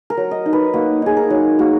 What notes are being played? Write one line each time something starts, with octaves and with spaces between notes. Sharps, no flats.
A#4
F#3
D#5
D#4
B4
A#3 F#4
D#4 G#4
A#4
F#3
A#3 F#4